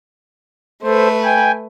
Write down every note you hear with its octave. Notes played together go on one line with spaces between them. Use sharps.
A3 A4 B4 C5
G5 G#5